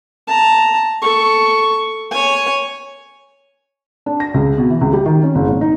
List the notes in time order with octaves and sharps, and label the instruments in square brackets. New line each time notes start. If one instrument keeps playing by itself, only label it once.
[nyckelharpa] A5 A#5
A4 C#6
C#5 G#5
[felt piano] D4
A#6
C#2
B2
E3
C#2
G3
D#3
C#4
F#1
G#1
D#4